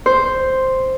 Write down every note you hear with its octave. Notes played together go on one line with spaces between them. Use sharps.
C5